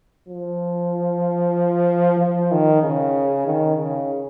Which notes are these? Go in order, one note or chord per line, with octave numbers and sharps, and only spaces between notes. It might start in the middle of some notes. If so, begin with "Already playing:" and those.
F3
F3
D#3
C#3
D#3
C#3